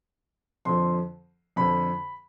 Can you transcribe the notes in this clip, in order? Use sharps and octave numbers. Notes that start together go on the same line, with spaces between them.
F2 D3 F3 C6
F2 D3 F3 B5